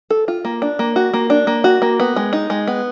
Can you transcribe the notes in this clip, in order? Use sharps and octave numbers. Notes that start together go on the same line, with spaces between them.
A4
F4
A#3
D4
A#3
F#4
A#3
D4
A#3
F#4
A#3
B3
G#3
D#4
G#3
B3